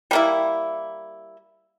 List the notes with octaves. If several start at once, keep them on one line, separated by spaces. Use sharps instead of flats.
G3 A#3 E4